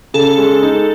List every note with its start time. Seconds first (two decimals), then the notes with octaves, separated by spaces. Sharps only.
0.14 C#3 A4
0.38 G#3
0.63 D#4